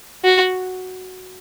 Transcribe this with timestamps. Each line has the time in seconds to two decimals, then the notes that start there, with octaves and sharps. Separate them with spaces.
0.24 F#4